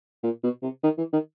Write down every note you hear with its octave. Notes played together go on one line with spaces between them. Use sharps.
A#2
B2
C3
D#3
E3
D#3